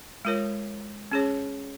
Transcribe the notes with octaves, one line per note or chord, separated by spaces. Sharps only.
G#3 F4 A#4 C#5
C#4 G#4 C#5